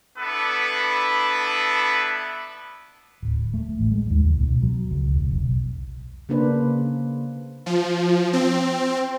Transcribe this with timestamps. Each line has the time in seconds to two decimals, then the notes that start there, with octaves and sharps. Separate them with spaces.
0.18 B3 D4 E4 A4 B4
3.23 D1
3.54 A3
3.79 A1
3.91 G#3
4.11 D#2
4.24 C#2
4.41 B2
4.62 F#3
4.91 C#2
5.14 E1
5.31 B1
6.29 C#3 A#3 D4 B4 C5
7.66 F3
8.33 C4